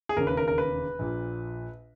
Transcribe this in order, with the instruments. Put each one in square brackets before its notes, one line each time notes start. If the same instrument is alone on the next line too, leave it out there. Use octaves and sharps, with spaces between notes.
[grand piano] G#4
E1 D#2 C#3 A#4
B4
A#4
A#4
B4
A#1 A#2